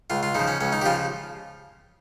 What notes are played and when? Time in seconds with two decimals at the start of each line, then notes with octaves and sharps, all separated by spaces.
0.10 C#2 F4
0.23 F4
0.35 C#3 F3 D#4
0.48 C#4
0.61 C#2 C#4
0.72 D#4
0.81 G4
0.85 C#3 F3 F4